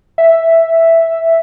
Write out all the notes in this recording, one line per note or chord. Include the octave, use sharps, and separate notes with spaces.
E5